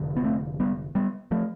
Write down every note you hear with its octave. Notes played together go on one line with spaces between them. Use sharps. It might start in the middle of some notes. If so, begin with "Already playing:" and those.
Already playing: F1 D3
B3
A3 C4
G3 B3
G3 B3
F3 A3